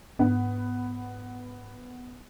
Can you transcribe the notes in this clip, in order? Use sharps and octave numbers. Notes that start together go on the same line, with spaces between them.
G#2 B3